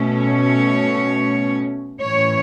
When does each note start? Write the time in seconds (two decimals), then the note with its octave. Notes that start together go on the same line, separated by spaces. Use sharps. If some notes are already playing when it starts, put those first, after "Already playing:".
Already playing: B2 A3 C#4
0.23 C#5
2.01 A2 E3 C#4 C#5